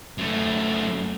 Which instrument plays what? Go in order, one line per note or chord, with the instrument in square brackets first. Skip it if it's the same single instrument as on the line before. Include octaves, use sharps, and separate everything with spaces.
[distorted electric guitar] F#2 A3